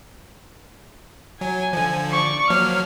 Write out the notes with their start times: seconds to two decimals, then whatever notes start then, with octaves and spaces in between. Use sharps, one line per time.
1.41 F#3 G#5
1.73 D3 F3
2.12 D5 C#6
2.50 F3 F#3 A#3 F6